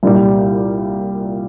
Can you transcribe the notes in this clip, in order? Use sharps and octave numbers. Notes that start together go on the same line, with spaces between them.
C2 A#2 G3